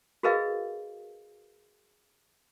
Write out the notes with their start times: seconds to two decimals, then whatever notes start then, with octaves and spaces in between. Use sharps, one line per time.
0.23 F#4 G#4 A#4 B4 D#5 F5